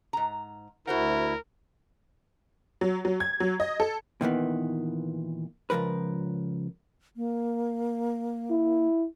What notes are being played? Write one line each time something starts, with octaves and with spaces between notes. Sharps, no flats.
G#2 A#5
D2 E4 F#4 A#4 C5 F#5
F#3
F#3
G#6
F#3
D#5
A4
A#2 D#3 E3 B3
C#2 A#2 F3 A#4 B4
A#3
E4